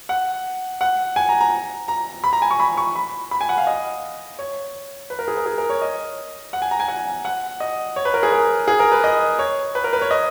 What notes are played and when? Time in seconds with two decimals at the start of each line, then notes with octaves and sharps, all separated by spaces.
0.09 F#5
0.81 F#5
1.16 G#5
1.29 A#5
1.40 A#5
1.88 A#5
2.24 B5
2.33 A#5
2.42 G#5
2.51 C#6
2.60 B5
2.77 C#6
2.96 B5
3.31 B5
3.41 G#5
3.49 F#5
3.58 F5
3.67 D#5
4.39 C#5
5.10 B4
5.19 A#4
5.28 G#4
5.37 A#4
5.46 G#4
5.58 A#4
5.70 C#5
5.82 D#5
6.53 F#5
6.62 G#5
6.71 A#5
6.80 G#5
6.88 F#5
7.25 F#5
7.60 D#5
7.96 C#5
8.05 B4
8.14 A#4
8.23 G#4
8.32 A#4
8.68 G#4
8.80 A#4
8.92 B4
9.04 D#5
9.39 C#5
9.75 B4
9.84 A#4
9.93 B4
10.01 C#5
10.11 D#5